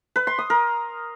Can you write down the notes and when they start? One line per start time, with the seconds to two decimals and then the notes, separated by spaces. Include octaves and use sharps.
0.16 B4
0.27 C6
0.38 D#6
0.50 A#4